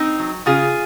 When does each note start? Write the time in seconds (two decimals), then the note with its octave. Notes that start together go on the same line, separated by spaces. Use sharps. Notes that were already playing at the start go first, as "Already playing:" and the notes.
Already playing: C4 D#4
0.19 F#3
0.46 C#3 F4 G#4